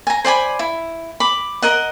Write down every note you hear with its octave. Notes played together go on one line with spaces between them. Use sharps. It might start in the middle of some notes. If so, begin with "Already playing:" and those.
G#5 A#5
C5 D5 G#5 B5
E4
B5 D6
A#4 D#5 F#5